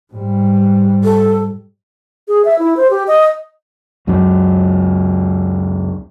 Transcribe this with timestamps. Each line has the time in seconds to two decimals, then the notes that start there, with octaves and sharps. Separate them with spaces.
0.13 G#2 G3
1.04 A4
2.28 G#4
2.45 E5
2.59 E4
2.77 C5
2.90 G4
3.07 D#5
4.07 C#2 F#2 C#3 F#3